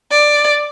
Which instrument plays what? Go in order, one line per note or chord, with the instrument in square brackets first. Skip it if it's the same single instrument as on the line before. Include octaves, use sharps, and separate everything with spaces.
[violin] D5